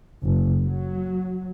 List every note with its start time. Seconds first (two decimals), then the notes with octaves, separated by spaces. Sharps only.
0.22 F#1
0.65 F#3